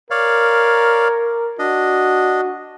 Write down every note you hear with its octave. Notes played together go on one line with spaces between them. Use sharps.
A#4 C#5 D5 F5
D4 F#4 D#5